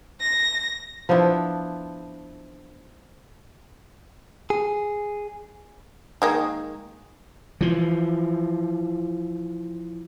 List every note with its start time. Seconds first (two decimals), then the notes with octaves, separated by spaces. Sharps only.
0.20 A#6
1.09 F3 B3 D4 E4
4.50 G#4
6.22 D#3 G#3 A#3
7.61 E3 F3